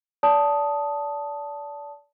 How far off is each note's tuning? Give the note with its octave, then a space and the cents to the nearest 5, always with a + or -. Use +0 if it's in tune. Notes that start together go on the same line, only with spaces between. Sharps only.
D5 -30 A5 +0 D#6 +0